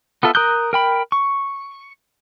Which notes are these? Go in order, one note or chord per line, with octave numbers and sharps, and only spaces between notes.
B3 F4 A4 E5
A#4 A#5 D#6 F#6 G6
A#4 G5 B5
C#6